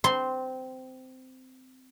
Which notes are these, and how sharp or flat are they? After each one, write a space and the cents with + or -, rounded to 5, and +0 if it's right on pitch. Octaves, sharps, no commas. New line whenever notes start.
C4 -15 C6 +0